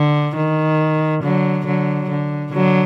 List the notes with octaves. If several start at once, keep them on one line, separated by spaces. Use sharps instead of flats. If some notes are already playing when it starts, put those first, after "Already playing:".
Already playing: D3
D#3
D3 F#3
D3 F#3
D3
D3 F#3